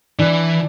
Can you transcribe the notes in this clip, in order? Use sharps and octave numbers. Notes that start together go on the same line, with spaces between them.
E3 D4